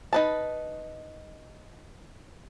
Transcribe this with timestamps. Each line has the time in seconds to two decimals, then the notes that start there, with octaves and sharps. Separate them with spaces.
0.13 D#4 B4 A5